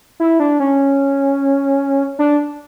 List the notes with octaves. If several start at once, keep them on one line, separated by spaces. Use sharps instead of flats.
E4
D4
C#4
D4